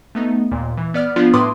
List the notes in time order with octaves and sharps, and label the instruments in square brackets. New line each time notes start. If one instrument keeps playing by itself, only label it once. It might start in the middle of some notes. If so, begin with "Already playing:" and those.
[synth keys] A3 B3 D#4
D#2 A#2
E3
B3 D5 F6
F3 B3 D4 F4
A2 B4 C6 D6 D#6